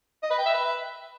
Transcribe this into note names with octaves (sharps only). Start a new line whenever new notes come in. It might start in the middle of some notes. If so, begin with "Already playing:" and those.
D#5
B4
G5
E5
B4